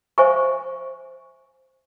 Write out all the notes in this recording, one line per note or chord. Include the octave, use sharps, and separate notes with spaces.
C5 E5 F5 G#5 C#6